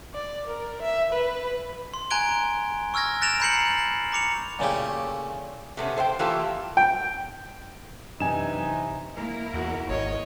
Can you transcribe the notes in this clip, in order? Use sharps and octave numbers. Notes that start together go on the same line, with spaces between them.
D5
A#4
E5
B4
C6
G#5 A#5 F#6 G#6 D7 G7
C#6 E6 F6 G#6 A#6
F#6 A6 A#6 D7 E7 F7
A#5 B5 G6 C7 C#7 F#7
A#5 D6 C#7 F7
A#2 C#3 A3 E4 G4
C3 A3 B3 C#4
A4 C5 E5 G5
E3 A3 A#3 F4 G4 A4
G5
F#2 C3 E3 D4 D#4 G#5 E7
A#3 E4 A#4
E2 F#4
G#1 C#5 D#5